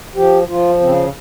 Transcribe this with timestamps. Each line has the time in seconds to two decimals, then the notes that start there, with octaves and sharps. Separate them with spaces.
0.15 F3 G4
0.48 F3 F4
0.80 C#3 C4